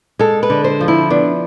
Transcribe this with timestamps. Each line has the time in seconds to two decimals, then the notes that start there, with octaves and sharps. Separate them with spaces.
0.19 G#3 A4
0.43 B4
0.50 D3
0.64 C5
0.81 F3
0.88 E4
1.10 B3 D4